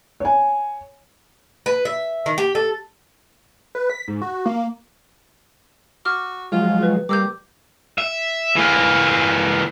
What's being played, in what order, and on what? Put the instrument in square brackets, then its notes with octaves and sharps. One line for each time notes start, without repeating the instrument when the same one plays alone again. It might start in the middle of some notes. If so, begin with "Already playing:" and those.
[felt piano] C#5 G#5
[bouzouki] B4
E5
D#3
G4
A4
[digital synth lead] B4
B6
G#2
F#4
A#3
[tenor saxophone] F#4 [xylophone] D6 F6
[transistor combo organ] F3 F#3 G#3 [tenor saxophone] F4
[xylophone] B4
[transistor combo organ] G3 [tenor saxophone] A#3 [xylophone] D6 E6 G6
[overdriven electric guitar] E5
E3 A#3